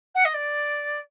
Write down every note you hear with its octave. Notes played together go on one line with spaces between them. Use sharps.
F#5
D#5
D5